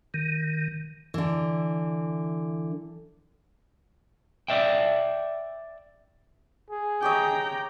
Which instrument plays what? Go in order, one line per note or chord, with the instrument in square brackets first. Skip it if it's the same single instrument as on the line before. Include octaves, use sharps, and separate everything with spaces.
[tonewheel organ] D#3
[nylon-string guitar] D3 E3
[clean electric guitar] D5 E5 G5
[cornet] G#4
[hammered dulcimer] G4 C#5 D#5 [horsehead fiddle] G5 A#5